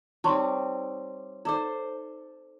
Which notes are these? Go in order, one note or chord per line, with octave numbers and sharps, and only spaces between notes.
G3 C4 D#4 C#5 A5 C6 C#6
D#4 A4 C5 D5 D6